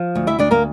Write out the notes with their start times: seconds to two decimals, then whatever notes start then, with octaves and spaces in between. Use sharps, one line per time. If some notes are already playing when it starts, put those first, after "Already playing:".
Already playing: F3
0.15 D2
0.27 E4 E5
0.39 D2 D4 D5
0.51 A#3 A#4